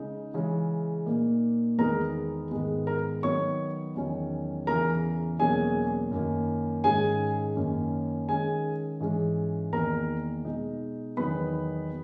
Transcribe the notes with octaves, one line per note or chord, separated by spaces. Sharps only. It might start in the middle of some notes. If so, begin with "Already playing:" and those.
Already playing: C#3 G#3 D#4
C#3 E3 G#3 C#4
A#2 A#3 D#4
E2 D#3 G#3 B3 D#4 A#4 A#5
G#2 D#3 G#3 B3
A#4 A#5
D#3 F#3 B3 C#5 C#6
E2 D#3 F#3 C#4
E2 C#3 E3 A#4 A#5
E2 B2 F#3 A#3 C#4 G#4 G#5
F#2 D#3 A#3
G#2 D#3 G#3 C#4 G#4 G#5
F#2 D#3 A#3 C#4
D#3 G#3 C#4 G#4 G#5
G#2 E3 G#3 C#4
E2 D#3 A#3 A#4 A#5
B2 G#3 D#4
E2 D#3 F#3 B3 D#4 B4 B5